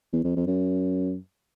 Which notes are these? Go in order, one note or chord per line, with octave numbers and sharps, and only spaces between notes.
E2
F2
F2
F#2